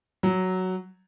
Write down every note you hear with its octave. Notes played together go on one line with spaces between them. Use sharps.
F#3